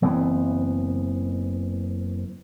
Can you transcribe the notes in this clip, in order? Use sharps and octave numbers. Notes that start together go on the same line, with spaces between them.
F#1 E3 B3 C4